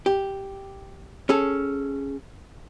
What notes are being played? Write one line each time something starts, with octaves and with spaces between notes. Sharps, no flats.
G4
C#4 G#4 A4